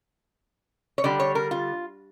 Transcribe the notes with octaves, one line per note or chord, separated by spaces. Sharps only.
C#5
D3 G3 D5
C#5
A#4
F4